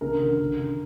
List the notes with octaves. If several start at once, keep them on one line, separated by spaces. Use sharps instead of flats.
D3 A#4
D3
D3
D3